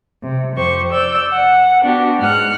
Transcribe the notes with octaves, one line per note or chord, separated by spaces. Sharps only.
C3
F2 G4 C5 C#6
D5 E6 G6
F#5
B3 D4 F#4 G4
G#2 F#5 F6 F#6